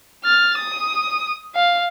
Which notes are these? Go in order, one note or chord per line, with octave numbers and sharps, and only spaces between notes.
F6 A6
D#6
F5